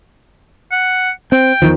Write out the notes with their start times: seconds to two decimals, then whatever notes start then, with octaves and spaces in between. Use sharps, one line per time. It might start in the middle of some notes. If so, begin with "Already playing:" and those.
0.72 F#5
1.32 C4 G5
1.62 E2 D#3 F3